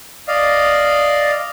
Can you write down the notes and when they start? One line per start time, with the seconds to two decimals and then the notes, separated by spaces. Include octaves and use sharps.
0.28 D5 D#5 F5